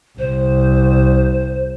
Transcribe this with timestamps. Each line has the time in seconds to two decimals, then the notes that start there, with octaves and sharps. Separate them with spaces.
0.19 C2 C5